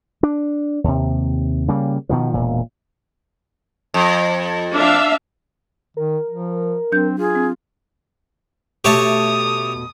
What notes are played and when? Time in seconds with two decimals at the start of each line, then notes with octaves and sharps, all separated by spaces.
0.23 D4
0.84 D#2 C3
1.68 C#3 G3 A#3
2.09 B2 D#3 F3
2.34 E1 A#2
3.94 F2
4.74 D4 E5 F5
5.97 D#3 A#4
6.29 F3
6.92 F#3 C4 D4 G6
7.18 F4 G#4
7.35 C4
8.85 B2 A3 G4 C#5 A5 D#6